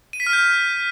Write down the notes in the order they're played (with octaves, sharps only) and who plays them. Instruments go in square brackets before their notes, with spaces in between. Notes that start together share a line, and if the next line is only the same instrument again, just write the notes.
[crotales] D#7
B6
F6
G6